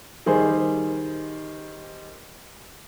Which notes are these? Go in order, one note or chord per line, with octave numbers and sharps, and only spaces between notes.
D#3 G3 G#4 C5